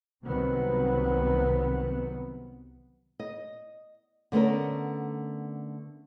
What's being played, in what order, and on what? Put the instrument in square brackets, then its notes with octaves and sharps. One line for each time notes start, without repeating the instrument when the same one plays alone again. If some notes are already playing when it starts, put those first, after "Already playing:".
[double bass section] C2 C3 D#3 F#3 B3 C4
[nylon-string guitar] D#5
D3 A3 B3 C#4 A#4